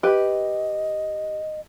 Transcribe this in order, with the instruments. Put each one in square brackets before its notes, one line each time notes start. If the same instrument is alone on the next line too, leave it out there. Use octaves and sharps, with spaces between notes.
[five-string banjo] G4 B4 [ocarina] D#5